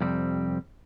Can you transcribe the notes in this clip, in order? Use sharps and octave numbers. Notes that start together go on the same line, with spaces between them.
F2 C3 G3 C4